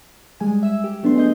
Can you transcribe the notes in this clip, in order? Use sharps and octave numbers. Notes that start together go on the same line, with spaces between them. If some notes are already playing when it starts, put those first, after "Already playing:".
G3 G#3 G#5
E5 G#5 E6
G4
F#3 A3 B3 D4 C6
G#4 D#5 G6